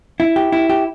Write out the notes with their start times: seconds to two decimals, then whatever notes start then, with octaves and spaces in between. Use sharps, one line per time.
0.20 E4
0.36 G4
0.52 E4
0.70 G4